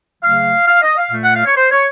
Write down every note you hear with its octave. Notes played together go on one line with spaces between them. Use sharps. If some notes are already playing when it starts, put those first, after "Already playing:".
C#3 F#3 A3 F5
F5
D#5
F5
A#2 A3
F#5
F5
C#5
C5
C#5